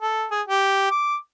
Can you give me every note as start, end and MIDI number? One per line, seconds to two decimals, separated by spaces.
0.02 0.26 69
0.31 0.41 68
0.48 0.87 67
0.91 1.16 86